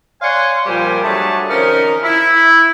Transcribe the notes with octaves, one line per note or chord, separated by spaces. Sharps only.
C#5 D5 F5 F#5 G#5 C6
A#2 F3 G3 A#3 C5 G#5
F#3 G3 A3 D4 G#4 A5
C3 D#3 F3 C#4 D#4 A#4
E4